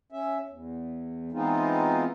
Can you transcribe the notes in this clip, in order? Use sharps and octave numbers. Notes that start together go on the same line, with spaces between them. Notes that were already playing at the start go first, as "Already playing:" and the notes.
C#4 E5
E2
E3 G#3 B3 C4 D#4 F4